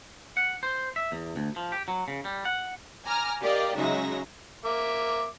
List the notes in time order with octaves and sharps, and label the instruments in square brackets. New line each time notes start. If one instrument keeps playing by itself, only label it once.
[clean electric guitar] F#5
C5
E5
E2
D2
F3
G4
F#3
C#3
G3
F#5
[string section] G#5 A#5 D6 F6 A#6
G4 A#4 D5 D#5 F5 G5
C#3 F#3 G#3 D#4 E5 A#6
[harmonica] A#3 E5 D6